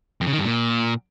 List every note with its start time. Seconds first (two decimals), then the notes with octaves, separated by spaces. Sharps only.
0.21 F2
0.27 C#3
0.33 D#3
0.39 G2
0.45 A#2